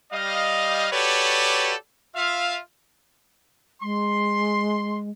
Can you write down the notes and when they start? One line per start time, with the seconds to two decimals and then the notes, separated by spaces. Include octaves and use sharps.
0.12 G3 D#5 F5
0.92 F#4 G4 A4 B4 C#5 D5
2.15 F4 E5 F5
3.82 G#3 C6